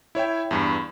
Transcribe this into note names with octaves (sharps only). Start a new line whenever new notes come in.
E4 C#5 E5 G5
E2 G2 B5